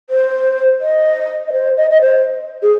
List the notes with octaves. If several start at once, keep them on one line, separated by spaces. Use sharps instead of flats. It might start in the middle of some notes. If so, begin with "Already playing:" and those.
C5
D#5
D#5
C5
D#5
D#5
C5
G#4